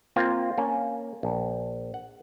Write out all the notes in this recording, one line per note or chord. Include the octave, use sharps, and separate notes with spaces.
A#3 C4 F4
A#3 C#4
A#1
F#5